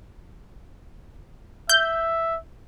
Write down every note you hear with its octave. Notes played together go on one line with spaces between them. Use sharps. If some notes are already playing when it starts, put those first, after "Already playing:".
E5 G6